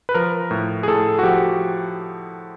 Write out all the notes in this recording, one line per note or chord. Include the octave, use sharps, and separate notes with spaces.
B4
F3 A#4
A2
G#4
A2 A4
F#4
F3 G4